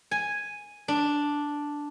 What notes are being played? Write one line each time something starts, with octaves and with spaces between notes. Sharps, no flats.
G#5
D4